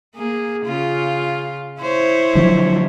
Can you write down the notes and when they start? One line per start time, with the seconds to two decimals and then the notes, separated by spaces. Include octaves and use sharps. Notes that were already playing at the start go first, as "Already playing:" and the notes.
0.15 A#3 G#4
0.66 C#3 F4
1.81 E4 C5 C#5
2.35 D3 F3 F#3